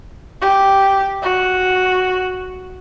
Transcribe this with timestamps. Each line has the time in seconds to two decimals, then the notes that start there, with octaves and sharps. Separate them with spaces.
0.41 G4
1.22 F#4